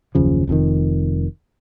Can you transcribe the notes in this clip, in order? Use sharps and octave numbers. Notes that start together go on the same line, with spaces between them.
F#1 D#2 C#3 F3
F1 F2 B2 D#3